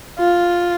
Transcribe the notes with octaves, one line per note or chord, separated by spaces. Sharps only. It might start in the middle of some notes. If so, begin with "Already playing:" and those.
F4